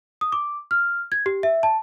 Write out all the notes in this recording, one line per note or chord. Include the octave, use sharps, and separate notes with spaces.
D#6
D6
F6
G#6
G4
E5
A5